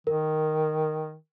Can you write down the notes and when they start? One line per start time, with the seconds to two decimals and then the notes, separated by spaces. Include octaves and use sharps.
0.07 D#3 A#4